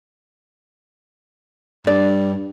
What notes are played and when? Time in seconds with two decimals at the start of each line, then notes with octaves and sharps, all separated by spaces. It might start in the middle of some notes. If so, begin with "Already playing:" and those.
1.87 G2 D5